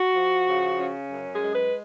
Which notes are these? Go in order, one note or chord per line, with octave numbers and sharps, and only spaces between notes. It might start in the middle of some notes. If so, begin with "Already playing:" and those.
Already playing: F#4
F3
C#3
C#4
F#2
G#4
G#3
B4